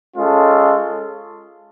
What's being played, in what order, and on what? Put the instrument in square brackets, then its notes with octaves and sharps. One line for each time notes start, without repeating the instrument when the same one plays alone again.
[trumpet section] G#3 C#4 F4 A4